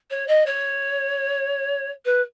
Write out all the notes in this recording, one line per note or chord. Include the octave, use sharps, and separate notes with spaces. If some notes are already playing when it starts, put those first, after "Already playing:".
C#5
D#5
C#5
B4